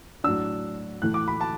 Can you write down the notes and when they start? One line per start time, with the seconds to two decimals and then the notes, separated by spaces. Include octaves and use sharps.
0.24 A2 F#3 D4 E6
1.02 A2 E3 A3 F#6
1.14 D6
1.28 B5
1.41 A5